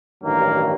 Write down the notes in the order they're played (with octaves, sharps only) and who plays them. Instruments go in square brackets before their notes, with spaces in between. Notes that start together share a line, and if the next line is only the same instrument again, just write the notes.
[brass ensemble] A1 G2 D#3 F#3 A#3